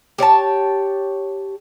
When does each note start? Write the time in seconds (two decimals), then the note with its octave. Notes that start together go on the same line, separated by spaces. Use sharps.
0.18 G4 C#5 D5 A5